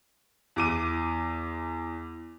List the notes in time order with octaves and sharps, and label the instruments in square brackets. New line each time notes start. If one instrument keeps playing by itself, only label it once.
[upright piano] E2 D6 D#7